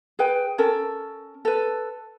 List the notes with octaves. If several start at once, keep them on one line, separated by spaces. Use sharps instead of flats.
G#4 B4 G5
C#4 A4 A#4
A4 B4